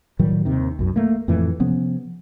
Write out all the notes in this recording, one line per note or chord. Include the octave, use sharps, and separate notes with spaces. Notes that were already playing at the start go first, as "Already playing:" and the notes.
A2 D#3 F#3 G3
D#2 C3 D#3
B1 F#2
A3 A#3
F2 A2 E3 A3
C3 F3 B3 C#4